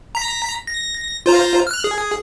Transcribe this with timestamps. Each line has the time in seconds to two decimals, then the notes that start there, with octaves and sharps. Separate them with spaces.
0.15 A#5 B6
0.67 A#6
1.26 F4 C5 A#5
1.67 F6 F#6
1.84 G#4